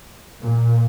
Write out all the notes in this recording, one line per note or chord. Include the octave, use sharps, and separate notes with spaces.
A#2